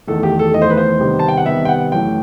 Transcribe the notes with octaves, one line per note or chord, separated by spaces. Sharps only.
E2 D#3 A3 A4
G4
A4
E2 D#3 A3 D#5
C5
B4
C5
C3 D#3 G3 B3
A5
G5
F#5
C3 D#3 G3 B3 E5
G5
F#5
F#2 E3 A3 G5